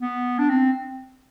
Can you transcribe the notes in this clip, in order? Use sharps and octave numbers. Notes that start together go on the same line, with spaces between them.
B3
D4
C4